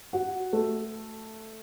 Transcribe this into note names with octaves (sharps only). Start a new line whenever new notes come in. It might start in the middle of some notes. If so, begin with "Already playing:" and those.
F#4
A3